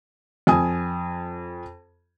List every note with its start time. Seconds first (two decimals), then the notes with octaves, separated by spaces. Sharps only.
0.47 F2 G#5 D#6